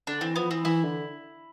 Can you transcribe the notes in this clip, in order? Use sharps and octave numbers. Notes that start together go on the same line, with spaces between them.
D3 D4
E3 C4
F3 B3
E3 C4
E3 E4
D3